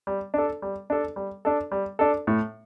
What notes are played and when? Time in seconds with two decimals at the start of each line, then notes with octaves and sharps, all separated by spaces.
0.07 G3
0.34 D4 A4
0.62 G3
0.90 D4 A4
1.16 G3
1.45 D4 A4
1.72 G3
1.99 D4 A4
2.27 A2